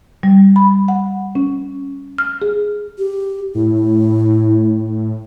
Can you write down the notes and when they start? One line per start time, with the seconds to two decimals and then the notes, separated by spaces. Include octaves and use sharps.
0.23 G3
0.56 B5
0.88 F#5
1.35 C#4
2.18 F6
2.42 G#4
2.98 G4
3.55 A2 E4